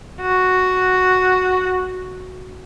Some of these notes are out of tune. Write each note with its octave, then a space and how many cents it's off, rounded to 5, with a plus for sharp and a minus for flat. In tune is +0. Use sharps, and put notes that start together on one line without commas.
F#4 +0